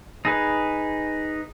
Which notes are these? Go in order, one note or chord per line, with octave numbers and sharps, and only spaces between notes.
D#4 G#4 B4